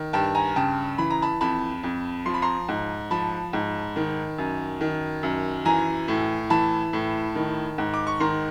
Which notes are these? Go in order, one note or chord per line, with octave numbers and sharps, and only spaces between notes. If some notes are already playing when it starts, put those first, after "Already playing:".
Already playing: D#3
G2 G5 A5
G#5 A#5
C#3 G5 A5
E3 B5
A#5
A5 B5
F2 A5 B5
F2
F3 C6
B5
A#5 C6
G#2
F3 A5 B5
G#2
D#3
F#2
D#3
F#2
E3 G#5 A#5
A2
E3 A5 B5
A2
D#3
G#2
D6
C#6
D#3 A#5 C6